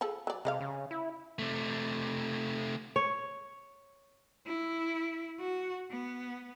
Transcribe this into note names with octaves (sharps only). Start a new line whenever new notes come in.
F3 G#4 A4
F#3 D5
C3 G#3 D5 F5
C#3
E4
C3 A3
C#5
E4
F#4
B3